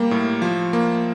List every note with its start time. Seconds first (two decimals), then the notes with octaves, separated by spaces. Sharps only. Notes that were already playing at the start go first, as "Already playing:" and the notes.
Already playing: G3 A#3
0.11 A2
0.42 F3
0.73 A#3